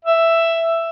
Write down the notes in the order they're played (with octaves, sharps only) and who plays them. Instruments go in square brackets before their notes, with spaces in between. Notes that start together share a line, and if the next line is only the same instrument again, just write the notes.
[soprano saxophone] E5